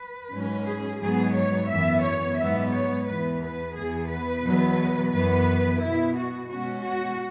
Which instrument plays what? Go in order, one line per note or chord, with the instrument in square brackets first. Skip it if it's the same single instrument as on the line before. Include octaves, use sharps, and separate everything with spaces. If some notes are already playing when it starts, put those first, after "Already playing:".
Already playing: [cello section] B4
G#2 F#3 C#4
G#4
G#2 F#3 B3 G#4
C#5
F#2 E3 B3 E5
C#5
G#2 F#3 B3 E5
C#5
E2 E3 B3 B4
B4
E2 E3 B3 G#4
B4
E2 B2 F#3 B3
F#2 E3 B3 B4
B2 B3 E4
F#4
B2 G#3 C#4 F#4
F#4